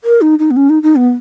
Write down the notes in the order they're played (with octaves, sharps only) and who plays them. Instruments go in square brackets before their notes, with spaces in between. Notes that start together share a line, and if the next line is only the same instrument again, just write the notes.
[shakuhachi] A#4
D#4
D#4
B3
C#4
D#4
D#4
B3